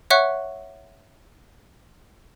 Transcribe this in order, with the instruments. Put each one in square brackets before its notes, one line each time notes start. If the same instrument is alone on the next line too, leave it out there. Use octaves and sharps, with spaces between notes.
[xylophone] C#5 E5 F#5 C#6 F#6